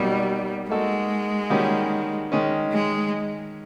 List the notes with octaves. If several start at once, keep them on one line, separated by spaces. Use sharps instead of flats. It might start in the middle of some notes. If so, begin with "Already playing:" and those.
Already playing: B2 F#3 G3 A#3 D#4
G#3 A#3 D#4 F#4 A4
D#3 G3 A#3 C#4 F#4
D#3 G#3 C#4
G#3